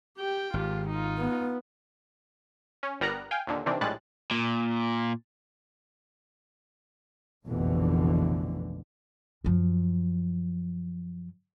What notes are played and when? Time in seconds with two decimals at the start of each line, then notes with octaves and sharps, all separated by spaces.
0.18 G4 G5
0.54 G#1 F4 G4
0.89 D#4 F4
1.18 B3
2.83 C#4
3.00 G1 G3 B3 A#4 A#5 F#6
3.31 F5 G5 G#5
3.47 D#2 A#2 D3
3.66 C3 D#3 E3 C4 D4
3.81 A#1 A2 G3 G#3 F#6 A6
4.31 A#2
7.46 F1 A#1 F2 B2 D3 E3
9.44 F#2 F3